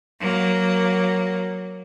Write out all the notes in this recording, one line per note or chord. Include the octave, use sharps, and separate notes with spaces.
F#3 A#3